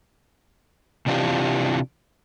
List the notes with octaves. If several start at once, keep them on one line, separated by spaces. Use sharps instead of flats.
C3 E3 D4 F4 G4